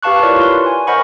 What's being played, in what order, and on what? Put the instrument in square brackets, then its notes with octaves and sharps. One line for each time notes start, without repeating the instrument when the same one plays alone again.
[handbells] G4 B4 F5 A5 C#6 F#6
E4 F4 A#4 C#5 D5 C#6
B4 C6
G#5
A#4 C5 D#5 F#5 B5 C#6